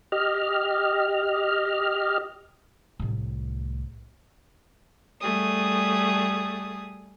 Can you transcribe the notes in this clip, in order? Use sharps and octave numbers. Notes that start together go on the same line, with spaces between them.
G4 D#5 F6
C2 A2
G3 A3 G#4 D#6